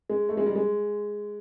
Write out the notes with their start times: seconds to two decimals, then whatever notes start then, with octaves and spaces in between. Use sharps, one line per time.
0.09 G#3
0.29 A3
0.37 G#3
0.46 G3
0.56 G#3